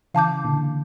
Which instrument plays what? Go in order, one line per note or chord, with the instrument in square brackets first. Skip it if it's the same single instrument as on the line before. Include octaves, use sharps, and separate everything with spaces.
[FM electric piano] C#3 E3 [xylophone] F5 A5 D6 G6
[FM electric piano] A#2 D3